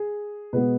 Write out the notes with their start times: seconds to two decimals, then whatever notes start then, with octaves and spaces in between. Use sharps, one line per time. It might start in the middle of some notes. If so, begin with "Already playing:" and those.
Already playing: G#4
0.53 B2 G#3 B3 B4